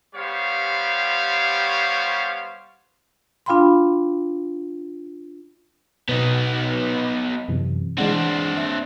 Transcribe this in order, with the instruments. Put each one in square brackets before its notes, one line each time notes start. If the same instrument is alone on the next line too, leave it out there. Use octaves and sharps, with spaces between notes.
[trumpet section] G3 B3 G4 C5 C#5 F5
[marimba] D4 F4 F5 G5 B5 C6
[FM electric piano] B2 [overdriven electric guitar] B3 D#4
[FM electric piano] F#2 C3 E3
[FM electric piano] E3 G#3 F#5 [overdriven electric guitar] C4 D4
[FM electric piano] E5 F#6